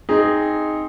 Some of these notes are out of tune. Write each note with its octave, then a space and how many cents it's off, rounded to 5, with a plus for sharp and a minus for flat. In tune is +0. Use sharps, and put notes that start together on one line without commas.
C4 +0 D#4 +0 G#4 +0